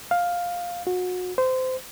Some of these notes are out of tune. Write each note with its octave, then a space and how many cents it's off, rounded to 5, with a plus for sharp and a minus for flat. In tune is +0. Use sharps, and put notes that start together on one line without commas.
F5 +10
F#4 -30
C5 -20